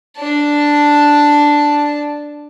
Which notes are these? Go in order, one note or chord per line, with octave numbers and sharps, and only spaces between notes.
D4 A5